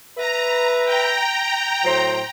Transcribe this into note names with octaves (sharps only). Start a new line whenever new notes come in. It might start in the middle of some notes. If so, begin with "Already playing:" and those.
B4 E5 A#5
G5 A#5
A2 F#3 C5